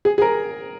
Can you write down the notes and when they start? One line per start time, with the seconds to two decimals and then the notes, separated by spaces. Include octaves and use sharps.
0.05 G#4
0.18 G#4
0.22 A#4